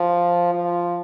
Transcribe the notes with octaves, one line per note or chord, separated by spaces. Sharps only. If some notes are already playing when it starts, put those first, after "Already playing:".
Already playing: F3
F3